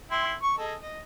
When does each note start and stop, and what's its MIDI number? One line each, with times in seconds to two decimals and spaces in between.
0.11 0.33 64
0.11 0.33 79
0.11 0.33 84
0.43 0.53 85
0.58 0.74 68
0.58 0.74 69
0.58 0.74 75
0.82 0.99 75